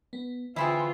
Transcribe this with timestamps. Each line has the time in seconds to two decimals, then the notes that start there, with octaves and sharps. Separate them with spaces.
0.13 B3
0.56 D3 E3 G#3 C4 E4 F4